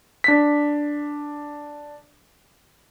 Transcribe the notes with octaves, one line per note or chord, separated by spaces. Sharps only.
D4 B6